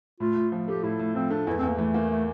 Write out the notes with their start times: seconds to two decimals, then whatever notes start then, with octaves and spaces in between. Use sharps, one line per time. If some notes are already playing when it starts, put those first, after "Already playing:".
0.20 A2 F4
0.36 A2
0.52 F3
0.68 A3 G4
0.83 A2 E4
0.99 A2
1.15 F3 C4
1.31 A3 D4
1.47 E2 E4
1.58 C4
1.63 E2
1.68 A#3
1.79 E3 A3
1.94 A#3
2.10 A3